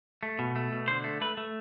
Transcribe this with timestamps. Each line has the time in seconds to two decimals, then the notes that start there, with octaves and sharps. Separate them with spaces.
0.23 A3
0.39 B2
0.56 A3
0.72 B2
0.88 D3 C5
1.04 A3
1.21 A3 B4
1.37 A3